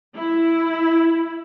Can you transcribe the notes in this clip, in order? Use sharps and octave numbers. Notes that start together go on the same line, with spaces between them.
E4